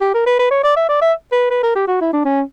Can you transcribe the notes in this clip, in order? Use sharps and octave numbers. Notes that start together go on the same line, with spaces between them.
G4
A#4
B4
B4
C#5
D5
E5
D5
E5
B4
B4
A#4
G4
F#4
E4
D4
C#4